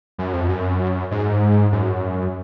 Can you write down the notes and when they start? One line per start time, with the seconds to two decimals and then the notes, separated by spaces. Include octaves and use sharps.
0.18 F#2
0.33 F2
0.48 F#2
1.11 G#2
1.72 F#2